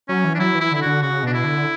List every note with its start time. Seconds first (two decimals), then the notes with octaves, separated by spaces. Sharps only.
0.09 F#3 C#4
0.24 E3
0.35 D4
0.40 F#3 E4
0.55 E3
0.61 E4
0.71 D3 E4
0.82 D3 F#4
1.02 C#3 F#4
1.23 B2 D4
1.33 E4
1.44 D3